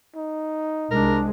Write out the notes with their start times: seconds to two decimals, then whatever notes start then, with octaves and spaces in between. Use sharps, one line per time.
0.16 D#4
0.91 C2 G#3 D4 A#4